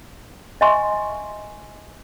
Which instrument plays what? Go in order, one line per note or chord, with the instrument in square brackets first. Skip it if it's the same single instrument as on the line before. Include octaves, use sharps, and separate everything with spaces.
[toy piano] D#5 E5 G#5 C6 C#6